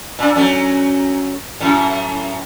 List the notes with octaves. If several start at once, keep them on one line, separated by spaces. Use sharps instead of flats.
A#2 D4
F#3 A3 C#4
F#2 A2